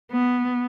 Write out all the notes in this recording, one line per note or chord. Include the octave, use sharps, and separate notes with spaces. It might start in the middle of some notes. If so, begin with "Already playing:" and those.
B3